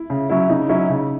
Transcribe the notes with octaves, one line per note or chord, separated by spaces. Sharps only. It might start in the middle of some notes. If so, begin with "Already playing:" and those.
Already playing: E4
C#3
F#3 C#4 E4
C#3 D#4
F#3 C#4 E4
C#3